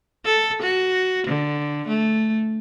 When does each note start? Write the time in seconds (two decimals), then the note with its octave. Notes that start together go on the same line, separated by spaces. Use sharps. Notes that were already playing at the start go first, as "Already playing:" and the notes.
0.25 A4
0.62 F#4
1.27 D3
1.88 A3